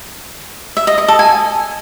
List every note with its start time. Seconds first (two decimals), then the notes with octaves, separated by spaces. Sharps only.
0.77 E5
0.87 D#5
0.98 D#5
1.08 A4
1.19 G#5